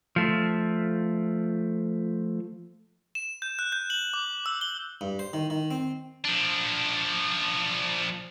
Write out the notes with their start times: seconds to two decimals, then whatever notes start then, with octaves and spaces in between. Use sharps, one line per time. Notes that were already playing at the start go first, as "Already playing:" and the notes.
0.16 F3 A3
3.15 E7
3.42 G6
3.59 F#6
3.72 G6
3.90 F#7
4.14 D6
4.46 E6
4.61 G7
5.01 G2
5.19 C5
5.33 D#3
5.50 D#3
5.71 C4
6.24 F3 D4